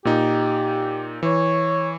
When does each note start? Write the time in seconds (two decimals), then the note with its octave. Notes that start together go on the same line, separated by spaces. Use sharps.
0.05 A#2 D#4 G4
1.23 E3 C#5